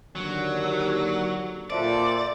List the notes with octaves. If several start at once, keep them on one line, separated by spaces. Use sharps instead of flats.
D#2 D3 F#3
A#2 F4 A4 C5 D5 E5 D7